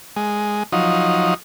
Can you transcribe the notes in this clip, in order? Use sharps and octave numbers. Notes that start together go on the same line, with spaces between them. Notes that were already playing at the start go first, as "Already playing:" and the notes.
G#3
F3 F#3 D#4